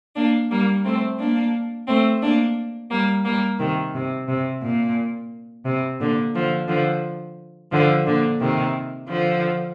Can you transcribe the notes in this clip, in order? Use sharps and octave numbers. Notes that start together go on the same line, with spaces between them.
A#3 D4
G3 A#3
A3 C4
A#3 D4
A3 C4
A#3 D4
G3 A#3
G3 A#3
C3 D#3
C3
C3
A#2
C3
A#2 D3
D3 F3
D3 F3
D3 F3
A#2 D3
C3 D#3
D3 F3